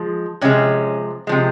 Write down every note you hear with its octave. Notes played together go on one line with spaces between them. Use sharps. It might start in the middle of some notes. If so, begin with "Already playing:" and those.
Already playing: F3 G#3
C3 F3 G#3 C#4
C3 F3 G#3